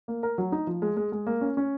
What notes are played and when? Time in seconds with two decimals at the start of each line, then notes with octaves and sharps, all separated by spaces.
0.08 A#3
0.23 A#4
0.38 F#3
0.52 D#4
0.67 F3
0.82 G#3
0.97 G#3
1.12 G#3
1.27 A#3
1.41 C#4
1.57 C#4